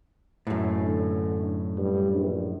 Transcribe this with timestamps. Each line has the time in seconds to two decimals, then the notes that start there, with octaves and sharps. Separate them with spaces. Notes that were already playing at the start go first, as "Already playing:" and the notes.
0.47 F#2 A2
0.83 D3
1.78 G2
2.15 A#1